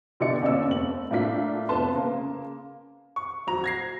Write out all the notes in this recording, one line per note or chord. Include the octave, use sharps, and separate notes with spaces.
B2 D3 E4 G4 D5 C#7
D#2 C#4 D5 E6
F1 B3 F#7
A2 A#3 D4 F4 B6
F1 B3 B4 A5 C6
C#3 A#3
C#6
F2 F#3 A#5 F7
G#6 A#6 C7